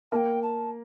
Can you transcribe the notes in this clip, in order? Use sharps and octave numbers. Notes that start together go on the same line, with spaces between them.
A#3 G5 A5
A5